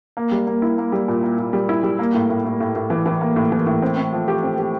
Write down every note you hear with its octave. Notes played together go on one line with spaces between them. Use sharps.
A#3
G3
A#3
E4
A#3
G3
A#2
A#3
A#2
G3
E4
G3
A#3
A2
A2
A2
A2
A2
E3
E3
A#3
A2
E3
A2
C4
C4
F3
G4
C4
G4